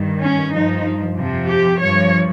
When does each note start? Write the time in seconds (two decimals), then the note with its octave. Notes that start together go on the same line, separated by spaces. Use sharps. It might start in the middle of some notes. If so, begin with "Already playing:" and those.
Already playing: G2 D#3
0.19 C#4
0.51 G2 F3 D#4
1.16 F2 C3 F3
1.48 G4
1.80 G2 F3 C#5